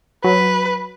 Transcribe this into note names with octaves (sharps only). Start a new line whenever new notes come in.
F#3 B4